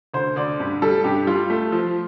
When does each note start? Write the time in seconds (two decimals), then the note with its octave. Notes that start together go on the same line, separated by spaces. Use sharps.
0.14 D2 C5
0.36 D2 D5
0.60 G2
0.82 G3 A4
1.04 G2 G4
1.27 G3 F4
1.50 A3
1.72 F3